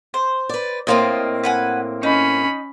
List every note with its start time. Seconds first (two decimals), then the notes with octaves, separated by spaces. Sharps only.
0.14 C5
0.49 B4 D5
0.87 A2 A#3 C4 F4 D#5
1.44 B4 F#5 G#5
2.03 C#4 D#4 B5